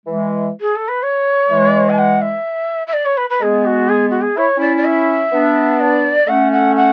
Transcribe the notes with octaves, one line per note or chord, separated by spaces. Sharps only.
E3 G#3
G#4
A4
B4
C#5
E3 G#3
G#5
F#5
E5
E5
D5
C#5
B4
B4
G#3 B3 G#4
F#4
G#4
F#4
G#4
E4 C#5
C#4 E4 D5
D5
E5
B3 D4
D5
A3 C#4 F#5
F#5
F#5